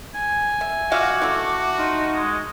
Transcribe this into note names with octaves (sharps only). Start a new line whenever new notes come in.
G#5
E5
F4 F#4 E5 F5 D6
A3 C#4 E4
D#4 F4
G#3